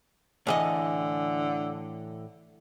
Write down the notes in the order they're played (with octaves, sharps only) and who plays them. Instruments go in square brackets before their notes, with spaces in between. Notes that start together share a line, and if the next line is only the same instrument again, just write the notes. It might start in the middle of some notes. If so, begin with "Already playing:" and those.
[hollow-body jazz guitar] A2 E3 D#5 [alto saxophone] D3